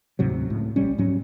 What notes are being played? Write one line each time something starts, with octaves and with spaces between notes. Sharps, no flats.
D2 G#2 C3 F#3
C#2 A2
A#1 G3 C#4
G#2 F#3 C#4